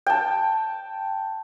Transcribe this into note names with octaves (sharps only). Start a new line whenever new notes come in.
G5 A5